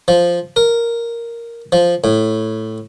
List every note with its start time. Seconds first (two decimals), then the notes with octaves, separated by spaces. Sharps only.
0.08 F3
0.56 A#4
1.72 F3
2.04 A2